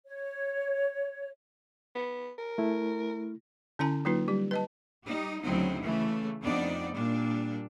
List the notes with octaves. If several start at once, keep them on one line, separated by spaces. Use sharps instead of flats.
C#5
B3
A#4
A3 E4
D3 C#4 E4 G#5 A#5
F#3 A#3 D#4 F4 B4
G3 G4
B4 D#5 A5
G3 D#4 G4
D2 C#3 F#3 C4 D#4 E4
C#3 E3 A3
F2 B3 D4 D#4 D5
A#2 G3 D4